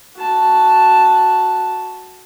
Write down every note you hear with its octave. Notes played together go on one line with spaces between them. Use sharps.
F#4 A5